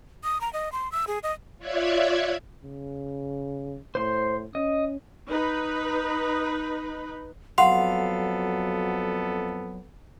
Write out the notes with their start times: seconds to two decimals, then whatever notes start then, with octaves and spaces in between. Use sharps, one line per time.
0.24 D#6
0.41 A#5
0.53 D#5
0.72 C6
0.92 E6
1.07 G#4
1.23 D#5
1.58 F4 C#5 D5 E5 F#6 G#6
2.63 C#3
3.95 A2 C5 C6
4.55 C#4 D#5
5.29 D#4 B4
7.58 F2 F#3 B3 A4 F5 F#5 C6